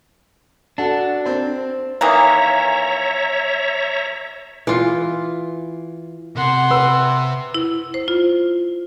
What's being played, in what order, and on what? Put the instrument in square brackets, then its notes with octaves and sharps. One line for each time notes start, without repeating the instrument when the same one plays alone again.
[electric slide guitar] D4 [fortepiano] F#4 A4
[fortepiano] C4 C5
[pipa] D#3 E3 A#3 [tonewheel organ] C#5 E5 A#5
[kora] E3 F4
[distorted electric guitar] C3 [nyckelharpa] F#5 C6
[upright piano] B4 E6
[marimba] E4
C5
F4